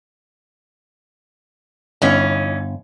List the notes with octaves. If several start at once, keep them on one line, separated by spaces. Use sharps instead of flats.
G1 E3 C#4 D#4